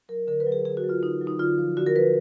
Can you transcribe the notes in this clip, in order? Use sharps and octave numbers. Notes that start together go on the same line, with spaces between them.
F#3 A#4
D3 A#4
B4
F#3
G#4
D3 G#4
F#4
F#3
F4
D3 D#4
F#3
D#4
D3 F4
F3
D3 F#4
A#4
F3 B4